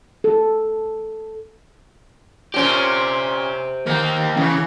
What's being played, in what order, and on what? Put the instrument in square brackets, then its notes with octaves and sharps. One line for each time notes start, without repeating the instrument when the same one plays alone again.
[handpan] A4
[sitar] A#2 C#4 [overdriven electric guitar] G4 C5
[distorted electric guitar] D#2 G5 [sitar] A#3
[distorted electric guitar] C#3 [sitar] E3